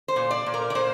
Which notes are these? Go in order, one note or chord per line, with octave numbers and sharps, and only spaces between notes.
C5
A#2
D5
A#2
A#4
D5
A#2 C5